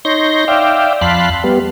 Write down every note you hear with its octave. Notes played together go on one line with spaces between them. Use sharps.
D#4 C#5 C6 G6 A#6
D5 E5 F5 G5
F2 F5 A5 B5 C6 F#6
G3 B3